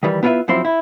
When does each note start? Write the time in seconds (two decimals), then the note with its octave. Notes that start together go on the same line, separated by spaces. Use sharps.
0.03 D#3 E3 G3
0.23 B3 E4 F4 A4 B4 E5
0.48 F#2 F3 C4 E4 C6
0.65 E4